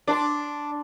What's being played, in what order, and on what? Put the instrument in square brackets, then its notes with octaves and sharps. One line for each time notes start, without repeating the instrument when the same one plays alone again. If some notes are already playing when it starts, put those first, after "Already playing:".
[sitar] D4 [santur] D5 A5 C6